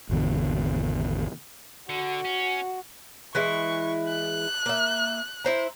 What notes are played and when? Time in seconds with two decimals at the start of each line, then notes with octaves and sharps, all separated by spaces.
0.10 G#1 E2 B2 D3
1.89 D3 F#4
2.25 C#4
3.35 E3 G#3 E4 C#6
4.09 F#6
4.66 A#3 E5
5.44 E4 C5 A#5